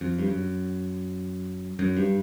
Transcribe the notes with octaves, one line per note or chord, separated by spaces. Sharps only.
F2
G2
F#2
F#2
G2